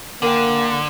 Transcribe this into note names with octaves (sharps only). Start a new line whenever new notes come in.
D3 A#3 A#4 G5